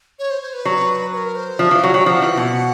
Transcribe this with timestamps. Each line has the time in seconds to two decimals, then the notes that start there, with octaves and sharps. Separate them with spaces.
0.19 C#5
0.31 C5
0.42 C5
0.54 B4
0.65 F#3
1.13 B4
1.17 A#4
1.36 C5
1.59 F3 E5
1.71 E3 F5
1.83 F#3 F#5
1.94 F#3 G5
2.06 F3 G5
2.10 F#5
2.22 E3
2.37 B2